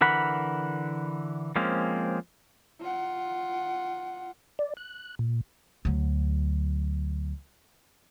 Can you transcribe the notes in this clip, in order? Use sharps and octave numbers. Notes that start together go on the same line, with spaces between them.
D3 E3 A#4 F#5 B5
F3 G#3 A#3 C4 C#4
F4 F#5
D5
F#6
A#2
D2 F#3